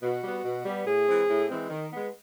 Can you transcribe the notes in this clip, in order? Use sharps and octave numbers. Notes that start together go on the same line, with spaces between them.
B2 F#4
G3 B3
B2
G3 B3
A2 G#4
E3 G#3 C4
A2
E3 G#3 C4
D#3
G#3 B3